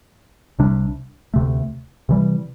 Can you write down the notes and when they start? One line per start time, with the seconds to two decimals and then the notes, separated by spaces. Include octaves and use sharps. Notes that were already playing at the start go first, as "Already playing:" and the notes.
0.59 C2 C3 G3 D4
1.34 D2 C3 A3
2.09 C3 E3 G3